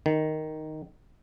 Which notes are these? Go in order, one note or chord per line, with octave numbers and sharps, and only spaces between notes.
D#3